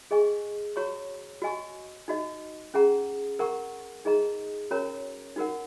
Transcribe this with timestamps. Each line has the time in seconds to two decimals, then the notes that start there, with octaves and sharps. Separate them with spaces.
0.11 G#4 D#5 G#5 C#6
0.76 F#4 C#5 A#5 C#6
1.42 F#4 D#5 G#5 C#6
2.08 D#4 F#4 D#5
2.74 C#4 G#4 F#5 A#5
3.39 A#4 F#5 A#5 C#6
4.05 D#4 G#4 D#5 A#5
4.71 C#4 F#4 A#4 C#5 A#5
5.36 D#4 F#4 A#4 F#5